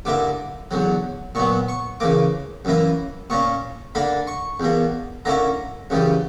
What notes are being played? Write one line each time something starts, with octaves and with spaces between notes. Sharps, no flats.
G2 D3 A#3 E4 D6
E2 D3 F#3
A#2 F#3 B3 C#6
C#6
C#3 E3 A#3 D6
F#2 E3 A#3 E4
A#2 A#3 C#4 C#6
D3 A#3 D4 B5
C#6
E2 B2 A#3
D3 A#3 C#4 E4 A#5
F#2 C#3 E3 G3